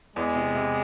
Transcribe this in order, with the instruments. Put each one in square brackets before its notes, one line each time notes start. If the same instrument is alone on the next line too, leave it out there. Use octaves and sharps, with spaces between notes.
[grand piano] E2 [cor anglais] G#3
[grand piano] C3
C3